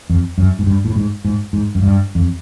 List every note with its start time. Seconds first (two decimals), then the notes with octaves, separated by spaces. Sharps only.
0.10 F2
0.38 F#2
0.59 G#2
0.66 G2
0.85 A2
0.96 G#2
1.25 G#2
1.53 G#2
1.75 F#2
1.82 G2
2.15 F2